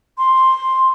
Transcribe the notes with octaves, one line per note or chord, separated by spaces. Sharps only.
C6